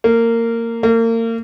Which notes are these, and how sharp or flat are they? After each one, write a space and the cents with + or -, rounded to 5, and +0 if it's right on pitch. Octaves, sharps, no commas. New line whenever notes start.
A#3 -20
A#3 -35